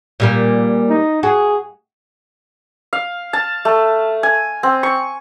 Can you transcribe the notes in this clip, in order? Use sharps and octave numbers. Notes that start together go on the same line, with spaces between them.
A#2 G3 A#3
D#4
F#4 G#4
F5
A5
A3
G#5
C4
C#6